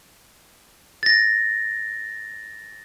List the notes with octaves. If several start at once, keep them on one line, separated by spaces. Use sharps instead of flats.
A6 A#6